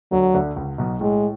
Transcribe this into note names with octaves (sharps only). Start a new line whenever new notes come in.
D2 D3 F#3
D2 D3
C#2 C#3
B1 B2
A2 G#3